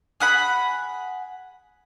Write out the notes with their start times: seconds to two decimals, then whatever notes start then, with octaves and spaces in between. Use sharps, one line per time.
0.20 G#4 F#5 B5